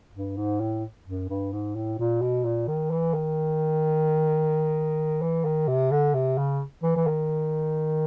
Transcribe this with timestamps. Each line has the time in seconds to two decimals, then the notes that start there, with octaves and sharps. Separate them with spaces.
0.14 G2
0.37 G#2
0.60 A2
1.07 F#2
1.29 G2
1.52 G#2
1.76 A2
1.99 A#2
2.22 B2
2.45 A#2
2.68 D#3
2.91 E3
3.14 D#3
5.22 E3
5.45 D#3
5.68 C3
5.91 D3
6.14 C3
6.38 C#3
6.83 E3
6.96 E3
7.07 D#3